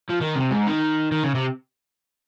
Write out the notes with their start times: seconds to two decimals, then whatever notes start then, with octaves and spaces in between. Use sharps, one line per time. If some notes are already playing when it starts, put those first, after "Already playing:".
0.09 F3
0.21 D#3
0.35 C3
0.51 G#2
0.67 D#3
1.12 D#3
1.24 C#3
1.35 C3